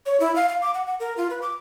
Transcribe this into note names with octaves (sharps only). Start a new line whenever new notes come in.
C#5
E4
F5
F5
D6
F#5
F#5
A#4
F4
B4
D6